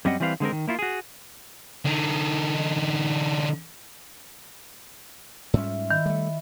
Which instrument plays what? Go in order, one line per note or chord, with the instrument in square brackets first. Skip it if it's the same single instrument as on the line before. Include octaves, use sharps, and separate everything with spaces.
[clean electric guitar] F#2 G3 C4 D#5 F#5
E3 G3 C4 B4 F5
D3 G#3 C4 A#4
D#3
A#3 E4 F4
F#4 G#4
[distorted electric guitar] D3 D#4
[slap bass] G#2 G3 C#4 [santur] F4 E5
[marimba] D#3 [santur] E4
[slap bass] G3 A3